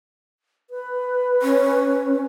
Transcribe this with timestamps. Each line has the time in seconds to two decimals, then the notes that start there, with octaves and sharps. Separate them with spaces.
0.70 B4
1.42 C#4